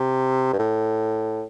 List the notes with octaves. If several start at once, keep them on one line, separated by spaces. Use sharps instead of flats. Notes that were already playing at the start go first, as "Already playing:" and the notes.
Already playing: C3
G2
A2